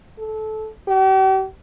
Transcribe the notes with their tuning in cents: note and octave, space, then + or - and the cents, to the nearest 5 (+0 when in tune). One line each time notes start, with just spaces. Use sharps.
A4 -20
G4 -45